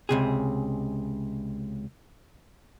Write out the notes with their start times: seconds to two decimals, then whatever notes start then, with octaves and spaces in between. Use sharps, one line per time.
0.09 C#2 C3 G#4